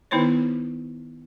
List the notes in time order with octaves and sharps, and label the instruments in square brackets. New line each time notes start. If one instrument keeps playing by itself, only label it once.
[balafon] D#3 B3 D#4 E4 C5 C#5